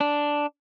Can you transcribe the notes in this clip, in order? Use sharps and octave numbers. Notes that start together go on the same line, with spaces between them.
D4